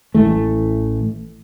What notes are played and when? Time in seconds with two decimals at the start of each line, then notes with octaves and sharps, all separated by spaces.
0.15 A1 E3 A3